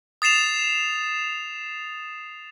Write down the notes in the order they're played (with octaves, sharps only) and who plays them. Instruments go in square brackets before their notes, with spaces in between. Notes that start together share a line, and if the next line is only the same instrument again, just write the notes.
[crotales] D#6 A6 C7 E7 F7